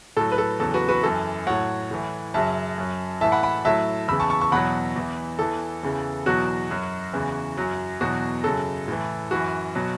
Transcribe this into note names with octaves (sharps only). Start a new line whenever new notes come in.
A2 F#3 A4
B4
A4
E2 C#3 F#3 A4
F#4 B4
F#4 B4
F#2 E3 A4
A2 F#3 C#5 F#5
A2 E3
F#2 C#3 F#3 E5 A5
F#2 F#3
A2 E3 E5 A5
F#5 B5
F#5 B5
A2 F#3 E5 A5
E2 C#3 E3 B5 E6
A5 C#6
A5 C#6
A5 C#6
E2 B2 F#3 F#5 B5
E2 E3
E2 E3 A4
E2 C#3 E3
E2 B2 F#3 F#4
F#2 F#3
E2 C#3 E3
F#2 F#3
E2 B2 F#3 F#4
F#2 C#3 F#3 A4
A2 E3
F#2 E3 F#4
B2 F#3